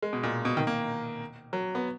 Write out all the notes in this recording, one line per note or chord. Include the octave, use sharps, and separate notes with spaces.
G#3
B2
A#2
B2
D#3
A#3
F#3
B3